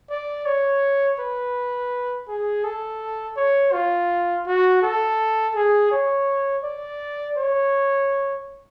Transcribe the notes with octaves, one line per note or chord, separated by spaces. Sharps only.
D5
C#5
B4
G#4
A4
C#5
F4
F#4
A4
G#4
C#5
D5
C#5